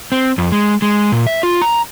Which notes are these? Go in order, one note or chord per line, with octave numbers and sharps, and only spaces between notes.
C4
F2
G#3
G#3
A#2
E5
F4
A#5